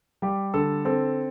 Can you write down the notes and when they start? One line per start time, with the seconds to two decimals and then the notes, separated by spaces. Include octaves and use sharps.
0.22 G3 G4
0.54 D3 A4
0.85 C4 A4